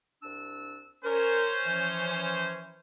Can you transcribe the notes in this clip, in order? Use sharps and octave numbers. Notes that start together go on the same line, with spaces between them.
C2 D4 E6
C#4 A#4 C5
E3 F3